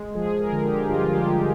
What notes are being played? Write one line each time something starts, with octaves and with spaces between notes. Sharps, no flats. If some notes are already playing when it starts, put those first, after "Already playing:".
Already playing: G#3
F3 G#4
A#4
D3
G4
G2 F4
G4
G#3
F4